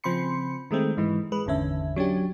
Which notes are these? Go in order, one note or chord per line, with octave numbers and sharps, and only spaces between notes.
C#3 F3 C4 B5 C6 C#7
D#3 G#3 A3 C4
G#2 E3 G#3
G#3 B4
G#1 E2 D3 C#4 E5
F#3 C#4 D4 G4